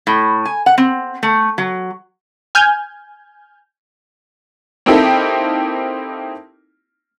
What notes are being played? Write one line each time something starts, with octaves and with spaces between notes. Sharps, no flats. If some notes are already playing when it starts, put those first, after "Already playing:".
A2
G#5
F#5
C4
A3
F#3
G#5 F6 G6 G#6
A#3 C4 D#4 E4 G4 A4